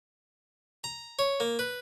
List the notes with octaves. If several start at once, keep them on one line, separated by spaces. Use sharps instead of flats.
A#5
C#5
A#3
B4